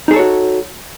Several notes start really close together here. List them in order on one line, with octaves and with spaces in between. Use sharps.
D#4 G#4 A4 C#5 F#4